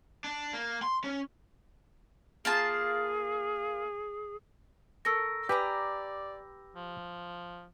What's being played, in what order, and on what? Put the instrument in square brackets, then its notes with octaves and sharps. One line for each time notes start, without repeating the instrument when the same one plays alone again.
[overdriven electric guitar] D4
A#3
C6
C#4
[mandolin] A#3 F4 A5 [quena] G#4
[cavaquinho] A4 A#4 C#6 [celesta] E6 A#6
[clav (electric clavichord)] G4 [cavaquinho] B4 G#5 A#5 [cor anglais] D5
[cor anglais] F3